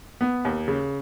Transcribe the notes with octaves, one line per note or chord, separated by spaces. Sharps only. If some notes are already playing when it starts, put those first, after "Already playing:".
B3
D#2
C#3